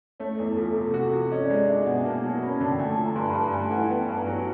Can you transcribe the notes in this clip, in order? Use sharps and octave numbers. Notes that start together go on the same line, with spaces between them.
A3 C#5
E2
F3 A4
A4
C3
A4
F#4
F3
C#4 D#5
D5
G#3
D#5
D4 E5
B2 F#5
G#5
A#3 A5
F#3 A5
C#4 B5
D3 A5
G5
A3 G#5
A5
F3 G#5
A#5
G2 C6
B5
G2 A5
A5
A3 G#5
E3 F#5
B3 G5
G2 A5
A#5
F#3 G#5